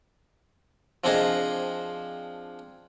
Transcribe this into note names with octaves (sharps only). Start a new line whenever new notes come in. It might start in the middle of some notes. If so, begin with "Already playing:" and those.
F3 C4 D4 G#4 C5 D#5